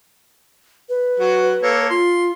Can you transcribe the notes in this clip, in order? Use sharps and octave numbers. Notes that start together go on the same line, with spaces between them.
B4
F#3 F#4
A#3 A4 C#5
F4 C6